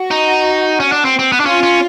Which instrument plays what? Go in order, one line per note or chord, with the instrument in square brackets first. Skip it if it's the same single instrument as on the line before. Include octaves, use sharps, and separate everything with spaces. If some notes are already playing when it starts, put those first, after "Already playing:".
Already playing: [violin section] F#4
[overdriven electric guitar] D#4
C#4
D4
C4
C4
B3
D4
[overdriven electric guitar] C#4 [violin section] F4
[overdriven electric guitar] C#4